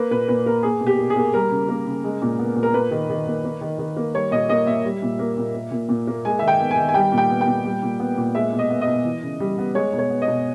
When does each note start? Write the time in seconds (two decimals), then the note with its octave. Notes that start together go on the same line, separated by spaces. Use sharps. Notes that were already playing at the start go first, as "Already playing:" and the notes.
Already playing: A#3 B4
0.11 A#2 B4
0.28 A#2 B4
0.46 A#3 A#4
0.63 A#3 G#4
0.81 B2
0.87 G4
0.99 B2
1.10 G#4
1.16 A#3
1.34 G3 A#4
1.51 C#3
1.69 A#3
1.86 C#3
2.04 G#3
2.22 A#2
2.39 B3
2.56 A#2
2.63 A#4
2.74 A#3 B4
2.91 D#3
3.09 D#3
3.27 A#3
3.45 A#3
3.61 D#3
3.78 D#3
3.97 A#3
4.14 G3 C#5
4.31 A#2 D#5
4.49 A#3 D#5
4.66 A#2 E5
4.85 G3
5.02 A#2
5.19 A#3
5.37 A#2
5.55 A#3
5.71 A#2
5.89 A#2
6.07 A#3
6.25 G#3 G#5
6.39 D#3 E5
6.48 G5
6.60 B3
6.71 G#5
6.77 D#3
6.89 G#5
6.94 G3 G5
7.12 A#2
7.18 G5
7.30 B3
7.41 G5
7.47 A#2
7.65 G3
7.83 A#2
8.00 B3
8.18 A#2
8.35 G#3 E5
8.52 B2
8.59 D#5
8.70 B3
8.81 D#5
8.87 B2
9.04 E3
9.23 C#3
9.40 G3
9.58 B3
9.75 G#3 C#5
9.93 B2
9.98 C#5
10.10 B3
10.22 D#5
10.28 B2